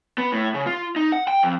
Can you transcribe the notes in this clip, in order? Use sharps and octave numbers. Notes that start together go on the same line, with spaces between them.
B3
A2
C#3
F4
D#4
F#5
G5
F2